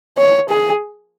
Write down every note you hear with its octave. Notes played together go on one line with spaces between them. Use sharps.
C#5
G#4